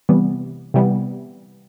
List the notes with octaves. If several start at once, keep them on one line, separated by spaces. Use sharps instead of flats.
C3 E3 G3 B3
C3 E3 G3 B3